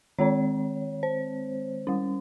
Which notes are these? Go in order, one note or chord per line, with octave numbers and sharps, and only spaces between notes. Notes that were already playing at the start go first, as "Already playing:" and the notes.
D#3 G#3 C4 C#5
C5
G3 C#4